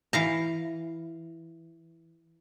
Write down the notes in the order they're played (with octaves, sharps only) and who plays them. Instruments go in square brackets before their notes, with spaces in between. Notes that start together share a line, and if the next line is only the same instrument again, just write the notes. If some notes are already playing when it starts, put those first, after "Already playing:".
[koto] E3 F5 A#5